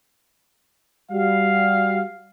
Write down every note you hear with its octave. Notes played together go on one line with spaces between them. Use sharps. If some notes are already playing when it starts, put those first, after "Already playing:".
G3 F#4 F5